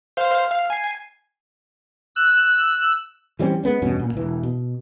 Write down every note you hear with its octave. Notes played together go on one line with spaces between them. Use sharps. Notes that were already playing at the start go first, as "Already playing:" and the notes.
C5 F5
F5
G#5 C7
E6 F#6
E3 G3 C4 C#4
G#3 B3 C#4
E2 G2 B2 C#4
A#2
E1 E3
B2